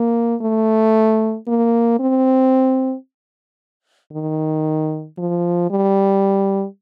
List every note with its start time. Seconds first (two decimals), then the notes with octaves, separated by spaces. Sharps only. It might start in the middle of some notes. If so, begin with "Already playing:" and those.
Already playing: A#3
0.41 A3
1.48 A#3
1.99 C4
4.12 D#3
5.18 F3
5.70 G3